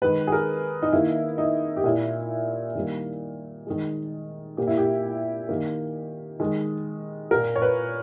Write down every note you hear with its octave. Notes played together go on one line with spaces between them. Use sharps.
D#3 G#3 B4
G#4
A#4
D#4
D#3 A#3 E4
D#4
G4
A#2 A#3 E4
D#3 G3 A#3
D#3 G#3
A#2 A#3 G4
E4
G4
D#3 A#3
D#3 G#3
A#2 A#3 A#4
C#5
B4